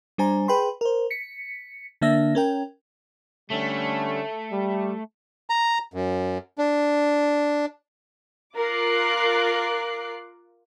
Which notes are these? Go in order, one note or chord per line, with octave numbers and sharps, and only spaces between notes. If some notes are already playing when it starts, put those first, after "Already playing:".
G3 D4 C5 G#5 A#5
G#4 B4 G5 B5 C6
A#4 C5
B6 C#7
D3 A#3 D4 E5 E6 A#6
C#4 A#4 G5
D3 G3 A3 C#4
G3
A#5
F#2
D4
F4 A#4 D6 F#6 C7